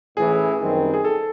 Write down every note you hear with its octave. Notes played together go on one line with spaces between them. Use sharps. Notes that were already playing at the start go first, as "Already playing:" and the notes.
A1 A2 E3 G#4
F#2 D#3 G3 C4
G#4
A4